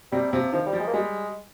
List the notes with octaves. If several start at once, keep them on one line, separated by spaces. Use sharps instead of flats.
C3 G3
C3 F3
D#3 F3
G3
F3
G#3
A#3
G3 G#3